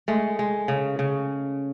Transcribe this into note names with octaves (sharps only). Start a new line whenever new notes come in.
G#3 A3
G#3
C#3
C#3